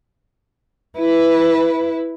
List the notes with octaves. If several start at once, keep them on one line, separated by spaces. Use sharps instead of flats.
E4 B4